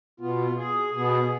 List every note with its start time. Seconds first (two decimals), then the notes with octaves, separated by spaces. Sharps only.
0.20 B2 B3 F4
0.57 G#4
0.93 B2 B3 G#4